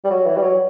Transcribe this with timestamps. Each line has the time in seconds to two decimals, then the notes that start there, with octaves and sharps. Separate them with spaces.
0.05 G3
0.10 F#3
0.26 E3
0.37 G3
0.42 F#3